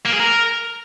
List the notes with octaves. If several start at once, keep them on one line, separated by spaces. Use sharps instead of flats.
A#3
G#4
A#4